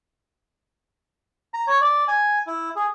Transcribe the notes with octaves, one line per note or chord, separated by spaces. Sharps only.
A#5
C#5
D5
G#5
E4
G#4